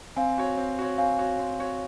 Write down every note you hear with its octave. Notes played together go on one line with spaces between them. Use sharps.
C4 F5 G#5
F#4 C#5
C4
F#4 C#5
C4 F5 G#5
F#4 C#5
C4
F#4 C#5